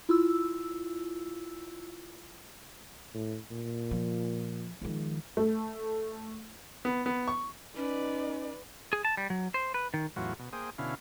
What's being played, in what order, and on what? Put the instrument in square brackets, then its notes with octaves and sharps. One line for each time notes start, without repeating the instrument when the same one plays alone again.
[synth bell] E4 F4 E6
[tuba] A2
A#2
[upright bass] F3
[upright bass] D#3 F3 [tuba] G#3
[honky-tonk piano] A3
[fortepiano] B3
B3
C#6
[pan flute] C#4 [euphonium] D#4 [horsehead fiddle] B4 D5
[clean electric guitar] G#4
A5
G3
F#3
C5
B4
D#3
[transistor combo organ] E2 A2 F#3 F4 F#4
B2
A#3 G#4 C5 G5 D#6
B2 D3 C#4 E4 F5